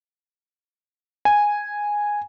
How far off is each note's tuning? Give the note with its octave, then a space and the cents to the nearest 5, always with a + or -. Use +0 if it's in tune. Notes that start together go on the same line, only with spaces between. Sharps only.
G#5 -5